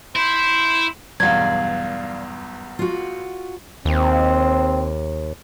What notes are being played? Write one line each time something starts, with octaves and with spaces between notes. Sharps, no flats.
E4 C5
B1 E2 G2 D5 F5 G#6
F4 F#4
D#2 C4